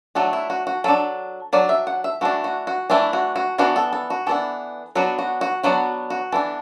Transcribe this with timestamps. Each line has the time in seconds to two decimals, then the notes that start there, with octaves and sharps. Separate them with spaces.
0.15 F#3 A3 D4 F#4
0.33 E4
0.50 F#4
0.67 F#4
0.84 F#3 D4 A4
1.53 F#3 D4 D5
1.69 E5
1.87 F#5
2.04 E5
2.21 E3 A3 D4 F#4
2.44 F#4
2.67 F#4
2.90 E3 A3 D4 E4
3.13 F#4
3.36 F#4
3.58 E3 B3 D4 F#4
3.76 A4
3.93 A4
4.10 F#4
4.27 E3 B3 D4 A4
4.95 F#3 B3 D4 F#4
5.19 F#4
5.41 F#4
5.63 F#3 B3 D4 F#4
6.10 F#4
6.32 E3 B3 D4 A4